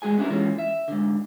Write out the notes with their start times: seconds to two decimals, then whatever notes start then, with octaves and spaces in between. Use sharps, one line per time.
0.02 G#3 F#4 G#4 G#5
0.17 B3 C#4 D4 E4 G4 A#4
0.30 E3 G#3 A#3 C#4 F4
0.59 E5
0.88 G#2 D3